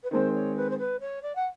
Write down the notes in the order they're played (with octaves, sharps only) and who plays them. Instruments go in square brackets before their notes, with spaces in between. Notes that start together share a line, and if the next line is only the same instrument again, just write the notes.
[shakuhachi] B4
[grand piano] D#3 G#3 C4 [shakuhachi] C5
[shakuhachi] C#5
B4
C5
B4
C#5
D5
F#5